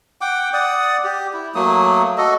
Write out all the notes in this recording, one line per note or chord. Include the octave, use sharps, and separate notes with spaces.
F#5 G5 D6
D5 F#5 D#6
G4
E4
F#3 A3 A#3 D#6
F#4 A4 D#5